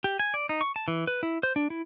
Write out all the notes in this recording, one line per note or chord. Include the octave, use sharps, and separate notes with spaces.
G4
G#5
D5
D#4
C#6
A5
E3
B4
E4
C5
D4
E4